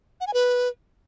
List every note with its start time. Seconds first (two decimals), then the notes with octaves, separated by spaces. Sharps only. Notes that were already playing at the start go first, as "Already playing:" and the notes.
0.21 F#5
0.27 G#5
0.34 B4